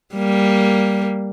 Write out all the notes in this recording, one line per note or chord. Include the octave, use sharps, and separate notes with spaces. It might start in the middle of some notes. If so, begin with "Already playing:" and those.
G3 A#3